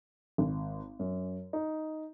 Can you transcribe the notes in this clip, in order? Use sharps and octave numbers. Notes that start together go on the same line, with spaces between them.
G#1
F#2
D#4